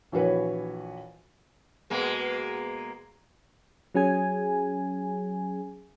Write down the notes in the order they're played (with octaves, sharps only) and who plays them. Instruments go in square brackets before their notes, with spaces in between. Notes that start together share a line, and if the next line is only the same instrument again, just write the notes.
[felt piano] A#1 E3 F#4 B4 C#5
[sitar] B2 G#3 A#3
[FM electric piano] F#3 C#4 G#4 G#5